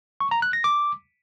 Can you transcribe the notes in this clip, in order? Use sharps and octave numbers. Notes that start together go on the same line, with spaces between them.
C#6
A#5
F#6
A#6
D6